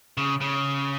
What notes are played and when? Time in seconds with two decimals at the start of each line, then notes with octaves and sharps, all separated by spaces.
0.17 C#3
0.41 C#3